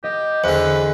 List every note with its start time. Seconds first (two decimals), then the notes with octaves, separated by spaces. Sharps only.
0.04 G4 D#5
0.44 E2 D3 B4 C5